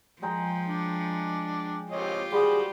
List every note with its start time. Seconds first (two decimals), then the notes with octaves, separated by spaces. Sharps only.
0.22 F3 G#3 G5 A#5
0.67 D4
1.92 C4 F4 G4 C#5 D#5
2.32 G3 F#4 G#4 C5